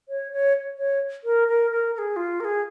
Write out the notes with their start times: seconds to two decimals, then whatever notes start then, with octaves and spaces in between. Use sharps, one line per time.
0.09 C#5
0.32 C#5
0.78 C#5
1.24 A#4
1.48 A#4
1.71 A#4
1.94 A#4
1.98 G#4
2.16 F4
2.40 A#4
2.45 G#4